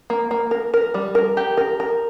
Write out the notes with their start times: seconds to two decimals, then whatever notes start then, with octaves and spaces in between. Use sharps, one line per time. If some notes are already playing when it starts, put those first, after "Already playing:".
0.10 A#3
0.31 A#3
0.51 A#4
0.74 A#4
0.94 G3
1.15 A#4
1.37 G4
1.57 A#4
1.80 A#4